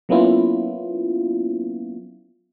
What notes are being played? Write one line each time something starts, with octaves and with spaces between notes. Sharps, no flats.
F#3 A#3 B3 C#4 E4 F4